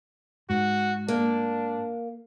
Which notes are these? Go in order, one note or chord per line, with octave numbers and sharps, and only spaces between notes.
G#2 F#4
A#3 D4